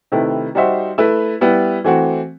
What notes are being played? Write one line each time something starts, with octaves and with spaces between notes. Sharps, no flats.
C3 D#3 A3 E4 B4
G3 D#4 F#4 C5 E5
A3 E4 B4 E5
G3 B3 E4 B4
E3 A3 C4 F#4